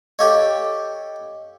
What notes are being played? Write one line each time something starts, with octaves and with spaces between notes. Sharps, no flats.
G4 A4 C#5 D#5 F5 D6